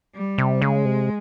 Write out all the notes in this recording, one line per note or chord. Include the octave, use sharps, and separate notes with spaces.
G3
C3
C#3 G#3
C3